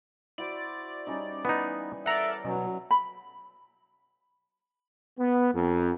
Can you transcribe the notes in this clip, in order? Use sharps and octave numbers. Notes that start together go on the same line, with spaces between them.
E4 F#4 C5 D5
G3 C#4 D#4
E3 B3 D#4 B5 C#6
A4 A#4 D5 E5 F#5 A#5
B2 F#3 C#4
B5
B3
F2